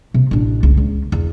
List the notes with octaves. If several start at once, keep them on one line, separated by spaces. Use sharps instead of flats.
C3
A1 D4
C#2
C#2
E2